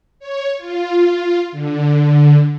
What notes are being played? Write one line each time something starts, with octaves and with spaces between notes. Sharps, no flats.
C#5
F4
D3